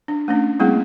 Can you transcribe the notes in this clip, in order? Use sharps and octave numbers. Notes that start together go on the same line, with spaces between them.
D4
A3 C#4 D4
G3 A3 A#3 C4 E4 G#4